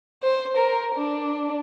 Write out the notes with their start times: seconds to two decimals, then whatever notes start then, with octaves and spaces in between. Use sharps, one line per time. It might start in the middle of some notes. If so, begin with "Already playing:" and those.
0.23 C5
0.57 A#4
0.95 D4